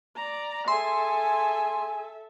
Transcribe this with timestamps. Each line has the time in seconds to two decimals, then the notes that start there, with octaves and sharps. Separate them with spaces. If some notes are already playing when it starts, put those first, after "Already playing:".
0.16 D5 A#5
0.68 G#4 A4 E5 G#5 C6